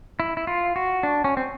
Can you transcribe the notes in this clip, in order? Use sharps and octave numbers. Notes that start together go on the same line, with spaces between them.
E4
E4
F4
F#4
D4
C#4
C4